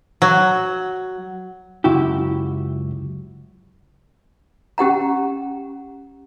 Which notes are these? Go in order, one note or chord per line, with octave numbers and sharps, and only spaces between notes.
F#3
C#2 F#2 E4 F#4 G4
C#4 G4 F#5 A#5